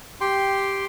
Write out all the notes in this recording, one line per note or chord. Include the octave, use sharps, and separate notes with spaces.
G4 G5 C6